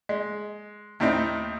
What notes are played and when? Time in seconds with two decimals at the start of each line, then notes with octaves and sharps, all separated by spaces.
0.09 G#3
1.00 D#2 A2 C4 D#4